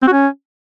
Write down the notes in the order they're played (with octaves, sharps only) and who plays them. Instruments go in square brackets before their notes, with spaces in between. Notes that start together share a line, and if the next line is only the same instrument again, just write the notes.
[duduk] C4
F#4
C#4